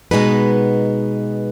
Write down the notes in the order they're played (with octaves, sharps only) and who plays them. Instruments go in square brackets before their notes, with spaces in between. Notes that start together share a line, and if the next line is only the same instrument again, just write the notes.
[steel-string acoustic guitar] B2 G#3 B3 D#4 B4